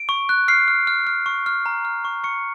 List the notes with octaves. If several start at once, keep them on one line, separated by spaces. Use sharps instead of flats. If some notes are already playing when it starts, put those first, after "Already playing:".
Already playing: D7
C#6
F#6
F6 C7
F6
F6
F6
C#6
F6
A#5
F6
C#6
C#6 C#7